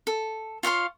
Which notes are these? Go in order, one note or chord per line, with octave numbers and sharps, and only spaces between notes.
A4
F4 C#5 F5 C6